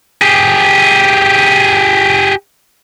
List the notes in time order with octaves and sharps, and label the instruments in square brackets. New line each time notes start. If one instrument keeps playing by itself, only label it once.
[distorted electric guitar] G4 G#4